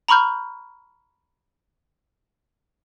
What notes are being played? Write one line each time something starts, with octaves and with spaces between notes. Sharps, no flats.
A#5 B5 C#6 F6 G6